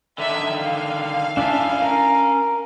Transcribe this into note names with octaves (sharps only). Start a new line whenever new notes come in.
D3 D#3 D4 E5
F5
C#4 D4 E4 E5 A5
A#4